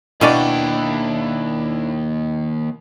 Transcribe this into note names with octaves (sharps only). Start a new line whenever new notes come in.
D#2 B2 C#4 D4 E4 D5 G5